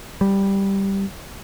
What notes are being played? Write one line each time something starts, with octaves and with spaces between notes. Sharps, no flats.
G3